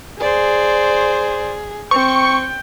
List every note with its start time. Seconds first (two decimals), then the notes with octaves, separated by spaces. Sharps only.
0.20 G#4 C5 D5
1.91 C4 G5 C#6